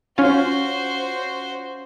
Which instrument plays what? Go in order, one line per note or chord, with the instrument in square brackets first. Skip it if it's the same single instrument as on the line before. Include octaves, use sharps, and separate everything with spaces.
[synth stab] C#4 F4 [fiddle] F#4 C5